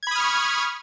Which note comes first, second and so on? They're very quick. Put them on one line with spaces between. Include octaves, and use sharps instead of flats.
G#6 B5 D#6 F6 C#6